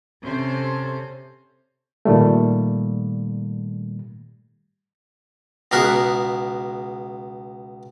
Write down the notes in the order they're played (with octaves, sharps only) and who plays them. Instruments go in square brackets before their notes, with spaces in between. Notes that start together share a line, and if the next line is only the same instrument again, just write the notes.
[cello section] C3 C#4 A4 C5
[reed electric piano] A#2 D#3 G3 A3
[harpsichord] C#2 B2 G#4 A#4 F#5 B5